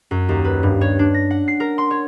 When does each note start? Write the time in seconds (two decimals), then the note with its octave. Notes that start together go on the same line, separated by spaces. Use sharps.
0.11 F#2
0.29 D#2
0.44 B4
0.63 G2
0.81 C#5
0.99 D4
1.14 A#6
1.31 F#5
1.48 C7
1.60 A#4
1.78 C6
1.91 C#5